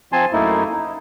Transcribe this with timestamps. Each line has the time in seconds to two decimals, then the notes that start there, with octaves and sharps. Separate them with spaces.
0.13 F3 C4 G#5 A5 C6
0.33 F#2 A3 A#3 D#4 E4
0.72 D#4